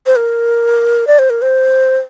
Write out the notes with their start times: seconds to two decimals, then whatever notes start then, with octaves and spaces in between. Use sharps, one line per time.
0.06 C5
0.16 A#4
1.07 D5
1.19 C5
1.30 A#4
1.42 C5